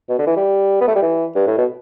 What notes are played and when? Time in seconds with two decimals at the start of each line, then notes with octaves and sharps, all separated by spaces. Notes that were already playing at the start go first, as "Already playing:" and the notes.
0.09 B2
0.19 D3
0.27 E3
0.36 G3
0.81 B3
0.88 A3
0.96 G3
1.02 E3
1.35 G2
1.47 A2
1.58 B2